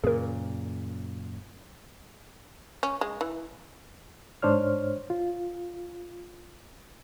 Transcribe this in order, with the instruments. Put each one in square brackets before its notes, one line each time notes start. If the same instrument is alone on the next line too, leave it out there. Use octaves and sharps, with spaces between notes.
[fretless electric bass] F#2 A#2 C#3 [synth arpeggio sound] G#4 A#4
[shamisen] C#4
G#3
E3
[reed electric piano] G#2 D4 C5 C#5 F6
F4